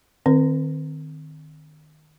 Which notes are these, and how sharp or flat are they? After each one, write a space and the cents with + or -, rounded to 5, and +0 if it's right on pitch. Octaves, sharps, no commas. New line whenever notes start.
D#3 -25 C4 +5 A#4 +0